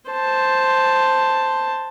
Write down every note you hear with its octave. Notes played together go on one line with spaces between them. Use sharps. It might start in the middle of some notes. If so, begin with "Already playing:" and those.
C5 A5